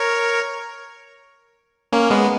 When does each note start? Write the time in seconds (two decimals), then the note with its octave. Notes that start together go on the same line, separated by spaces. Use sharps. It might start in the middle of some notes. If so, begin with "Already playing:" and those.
Already playing: A#4 C#5
1.92 A#3 C#4
2.10 G#3 B3